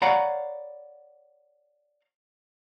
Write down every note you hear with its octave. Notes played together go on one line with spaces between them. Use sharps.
C#5 D5 F5 F#5 A#5 B5